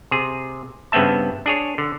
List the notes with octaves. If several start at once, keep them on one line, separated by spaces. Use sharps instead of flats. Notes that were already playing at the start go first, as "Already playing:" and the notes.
C3 G#4
G2 C#3 B3 C4 E5 A5
D4 G#4 C#5
D3